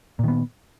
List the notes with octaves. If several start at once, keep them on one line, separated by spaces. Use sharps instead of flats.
A#2 D#3 B3